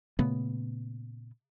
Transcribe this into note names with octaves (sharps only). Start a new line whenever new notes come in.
A#2 C#3 A3 B3